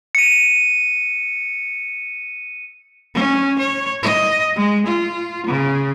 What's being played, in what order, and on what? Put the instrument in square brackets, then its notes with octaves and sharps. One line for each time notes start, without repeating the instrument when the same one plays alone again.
[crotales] C#7 D#7
[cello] C#4
C#5
D#5
G#3
F4
C#3